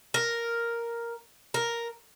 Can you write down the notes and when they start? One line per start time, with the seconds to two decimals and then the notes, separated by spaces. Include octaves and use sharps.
0.14 A#4
1.54 A#4